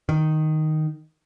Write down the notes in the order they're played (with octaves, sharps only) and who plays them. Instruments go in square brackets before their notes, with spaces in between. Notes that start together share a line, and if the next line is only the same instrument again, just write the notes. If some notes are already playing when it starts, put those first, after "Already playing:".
[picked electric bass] D#3